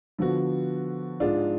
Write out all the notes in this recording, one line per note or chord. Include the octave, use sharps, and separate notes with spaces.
D3 F3 B3 F#4
G#2 G#3 D4 F4